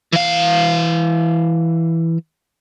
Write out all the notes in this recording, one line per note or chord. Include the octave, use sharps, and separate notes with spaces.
E3 F5